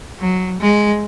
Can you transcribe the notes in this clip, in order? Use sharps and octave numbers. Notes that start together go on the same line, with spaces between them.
F#3
G#3